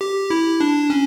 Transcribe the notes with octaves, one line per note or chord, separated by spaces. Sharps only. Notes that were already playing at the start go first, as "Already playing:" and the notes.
G4
E4
D4
C#4